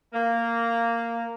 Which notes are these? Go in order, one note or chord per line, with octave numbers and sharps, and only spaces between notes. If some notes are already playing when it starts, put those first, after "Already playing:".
A#3